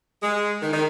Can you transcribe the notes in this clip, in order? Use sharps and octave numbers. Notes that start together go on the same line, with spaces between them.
G#3
D#3
D#3